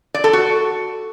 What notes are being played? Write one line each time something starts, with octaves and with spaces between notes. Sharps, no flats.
D5
A4
F#4